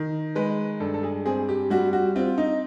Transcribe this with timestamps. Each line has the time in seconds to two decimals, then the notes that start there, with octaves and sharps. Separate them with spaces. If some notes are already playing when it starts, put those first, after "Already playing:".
Already playing: D#3
0.35 G#3 B4
0.80 G2 A4
0.94 A4
1.03 G#4
1.25 C4 G#4
1.49 G4
1.70 G3 F#4
1.93 F#4
2.16 C4 F4
2.38 D#4